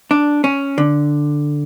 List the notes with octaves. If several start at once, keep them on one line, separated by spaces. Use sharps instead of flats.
D4
C#4
D3